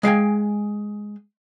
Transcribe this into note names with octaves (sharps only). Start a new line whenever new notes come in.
G#3 F5 G5 G#5